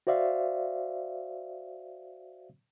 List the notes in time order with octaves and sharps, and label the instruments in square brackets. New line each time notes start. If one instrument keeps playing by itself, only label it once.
[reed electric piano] F#4 C5 D5 E5 F5